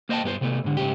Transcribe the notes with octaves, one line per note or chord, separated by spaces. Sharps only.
A#3 C5 D#5 E5 G5 A5
G2 B3 G4 C5
C3 A3 B3
G#2 D3
G#2 C#3 G4